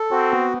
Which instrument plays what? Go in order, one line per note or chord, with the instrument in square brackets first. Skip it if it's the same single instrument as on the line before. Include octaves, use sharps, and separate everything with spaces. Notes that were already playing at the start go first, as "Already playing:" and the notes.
Already playing: [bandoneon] A4
[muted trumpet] C4 [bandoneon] F#4
[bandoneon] B3